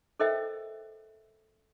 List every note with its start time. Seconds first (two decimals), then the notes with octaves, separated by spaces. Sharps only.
0.20 A4 A#4 C5 D#5 E5 G5